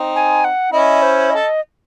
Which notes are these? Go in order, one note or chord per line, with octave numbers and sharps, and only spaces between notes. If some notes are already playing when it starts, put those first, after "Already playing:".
Already playing: C4 D#4
G#5
F#5
C#4 E4 D#5
C5
A4 D#5